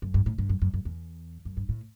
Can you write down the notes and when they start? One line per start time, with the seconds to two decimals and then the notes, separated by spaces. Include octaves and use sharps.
0.02 F#2
0.14 G2
0.26 A2
0.38 G2
0.49 F#2
0.62 F#2
0.74 F#2
0.85 E2
1.45 F#2
1.57 G2
1.69 A2